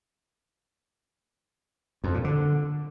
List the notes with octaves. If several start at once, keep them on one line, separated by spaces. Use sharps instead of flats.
F2
A#2
D3